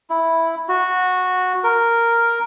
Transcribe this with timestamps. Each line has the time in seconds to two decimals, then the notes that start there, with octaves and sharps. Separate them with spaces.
0.10 E4
0.68 F#4
1.64 A#4